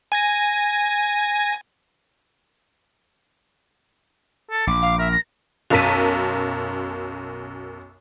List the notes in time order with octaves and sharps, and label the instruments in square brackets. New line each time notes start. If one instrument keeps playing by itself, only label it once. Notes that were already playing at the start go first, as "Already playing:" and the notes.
[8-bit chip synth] G#5 G#6 A#6
[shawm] A4
[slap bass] A#1 [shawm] D6
[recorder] F5
[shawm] A#4 [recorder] E5
[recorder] A#6
[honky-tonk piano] B1 F#2 A#4 A5 B6 D#7